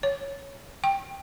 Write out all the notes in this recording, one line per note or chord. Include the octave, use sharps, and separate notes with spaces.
C#5
G5